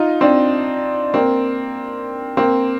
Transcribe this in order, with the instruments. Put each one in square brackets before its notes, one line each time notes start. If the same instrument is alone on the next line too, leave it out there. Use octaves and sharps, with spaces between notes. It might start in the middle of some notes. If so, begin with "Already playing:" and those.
Already playing: [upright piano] D#4 F4
C4 D4
A#3 C4
A#3 C4